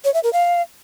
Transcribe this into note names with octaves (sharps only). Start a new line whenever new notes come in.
C#5
E5
A#4
F5